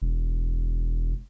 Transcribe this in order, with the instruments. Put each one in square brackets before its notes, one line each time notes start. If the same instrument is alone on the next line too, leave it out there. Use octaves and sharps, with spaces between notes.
[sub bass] E1